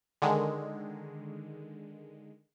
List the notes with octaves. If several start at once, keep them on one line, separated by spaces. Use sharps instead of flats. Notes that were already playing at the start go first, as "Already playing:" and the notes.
D3 D#3 G#3